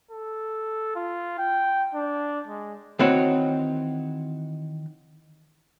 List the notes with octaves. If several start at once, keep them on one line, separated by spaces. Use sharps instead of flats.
A4
F4
G5
D4
G#3
D#3 E3 C4 F#4 C#5